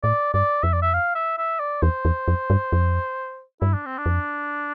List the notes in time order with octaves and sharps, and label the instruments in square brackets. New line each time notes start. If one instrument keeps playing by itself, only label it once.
[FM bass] A2 [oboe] D5
[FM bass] G2 [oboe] D5
[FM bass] F2 [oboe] E5
[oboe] D5
E5
F5
E5
E5
D5
[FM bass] E2 [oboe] C5
[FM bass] E2
F2
G2
F2
[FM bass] G2 [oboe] E4
[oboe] D4
C4
D4
[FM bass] F2